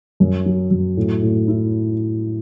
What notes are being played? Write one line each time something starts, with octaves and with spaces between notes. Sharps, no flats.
F#2
F#3
F#2
A2
A2
E4